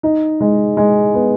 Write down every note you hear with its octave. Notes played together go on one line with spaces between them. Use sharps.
D#4
G#3
G#3
B3